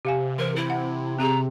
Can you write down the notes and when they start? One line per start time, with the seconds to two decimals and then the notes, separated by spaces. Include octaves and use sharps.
0.05 C3 G4 F5 G#5
0.38 E3 A#4 C5
0.56 E4
0.70 F#5
1.19 C4 G4 G#4 A#5